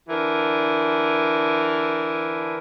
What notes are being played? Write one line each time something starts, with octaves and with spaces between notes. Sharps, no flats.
D3 E3 D4 A#4